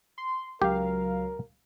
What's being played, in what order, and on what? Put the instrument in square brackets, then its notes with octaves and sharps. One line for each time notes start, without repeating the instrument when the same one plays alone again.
[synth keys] C6
[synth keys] C#2 F#3 F5 [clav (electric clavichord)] G4 [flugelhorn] A#4